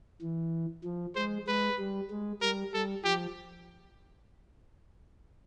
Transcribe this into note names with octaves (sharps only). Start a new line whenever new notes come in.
E3
F3
G#3 C5
G#3 B4
G3
G#3
G3 A#4
G3 A4
F3 G4